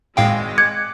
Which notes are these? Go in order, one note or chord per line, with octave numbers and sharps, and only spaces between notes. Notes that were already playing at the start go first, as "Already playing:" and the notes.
G#1 A2 G#3 F5 G5
D6 F#6 G#6 C#7